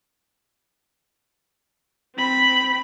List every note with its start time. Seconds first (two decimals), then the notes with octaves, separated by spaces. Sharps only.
2.16 C4 B5